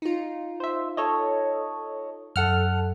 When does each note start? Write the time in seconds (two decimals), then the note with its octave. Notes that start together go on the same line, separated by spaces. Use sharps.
0.02 D#4 F4
0.60 C5 E5
0.97 A4 C#5 D#5
2.36 F#2 A4 F#5 F6